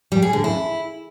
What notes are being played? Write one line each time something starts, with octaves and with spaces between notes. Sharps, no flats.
G3
G#4
D3
E4